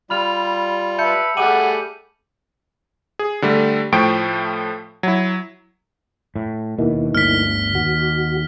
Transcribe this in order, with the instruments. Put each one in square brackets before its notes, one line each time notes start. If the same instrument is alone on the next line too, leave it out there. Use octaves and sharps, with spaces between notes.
[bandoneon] G3 F4 [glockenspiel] B5 F6 F7
[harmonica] B4 [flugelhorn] E5 [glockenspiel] A5 G6 C#7
[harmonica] G3 A3 G#4 [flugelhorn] F#5 [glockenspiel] D6 D#7 F#7
[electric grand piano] G#4
D3 G3 A3
A2 F3 A3 G5 C#6 D7
F#3 E4
[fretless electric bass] A2
[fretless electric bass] D#2 B2 [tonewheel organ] A#3 D#4 E4
[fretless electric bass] G1 D2 [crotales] F6 B6
[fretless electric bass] D#2 [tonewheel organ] F#4